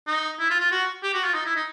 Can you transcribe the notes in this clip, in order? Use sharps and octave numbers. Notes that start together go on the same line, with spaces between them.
D#4
E4
F4
F4
F#4
G4
F#4
F4
D#4
E4
D#4